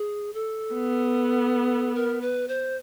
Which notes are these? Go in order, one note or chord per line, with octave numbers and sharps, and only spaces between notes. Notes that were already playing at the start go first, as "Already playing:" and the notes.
Already playing: G#4
A4
B3
A#4
B4
C5